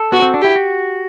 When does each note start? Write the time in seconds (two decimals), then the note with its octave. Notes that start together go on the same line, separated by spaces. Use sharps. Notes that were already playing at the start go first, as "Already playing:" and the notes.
Already playing: A4
0.12 B3 F#4
0.22 C4
0.34 D4
0.42 E4 G4
0.56 F#4